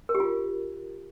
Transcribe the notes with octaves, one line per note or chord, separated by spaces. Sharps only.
A#4
G4
F4